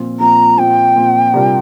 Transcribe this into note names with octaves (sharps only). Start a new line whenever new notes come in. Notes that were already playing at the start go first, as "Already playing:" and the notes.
Already playing: A#2 F3 C4 F4
A#2 F3 C4 F4 A#5
A#2 F3 C4 G5
A#2 F3 C4
C3 G3 D4 F4 A#4